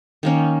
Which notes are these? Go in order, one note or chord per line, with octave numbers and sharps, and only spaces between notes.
D#3 A#3 C#4